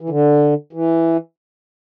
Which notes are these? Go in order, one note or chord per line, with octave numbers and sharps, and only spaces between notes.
E3
D3
E3